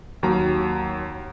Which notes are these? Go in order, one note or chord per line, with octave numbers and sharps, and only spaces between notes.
D#2 F#3 A#5